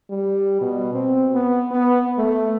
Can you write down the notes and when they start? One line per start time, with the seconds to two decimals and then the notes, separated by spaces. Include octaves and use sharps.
0.10 G3
0.61 B2
0.94 C4
1.34 B3
1.71 B3
2.18 A3